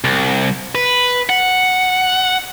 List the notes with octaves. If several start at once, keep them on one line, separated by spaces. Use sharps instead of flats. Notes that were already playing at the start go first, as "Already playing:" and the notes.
C2
B4
F#5